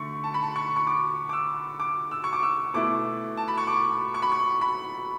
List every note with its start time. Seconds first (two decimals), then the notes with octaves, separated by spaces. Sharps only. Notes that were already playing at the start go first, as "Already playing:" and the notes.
Already playing: D3 A3 C#6
0.24 A5
0.34 B5
0.42 A5
0.56 C#6
0.76 C#6
0.87 D6
1.29 D6
1.33 E6
1.80 D6
2.11 E6
2.24 C#6
2.33 D6
2.43 E6
2.74 B2 A3 E4 D6
3.37 A5
3.48 B5
3.58 C#6
3.67 D6
4.14 C#6
4.22 B5
4.32 C#6
4.61 B5